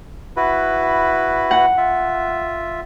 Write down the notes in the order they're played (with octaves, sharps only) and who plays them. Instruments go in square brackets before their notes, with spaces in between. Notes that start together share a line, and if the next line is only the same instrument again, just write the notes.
[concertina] E4 F#4 B4
[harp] F#5
[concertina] F4 E5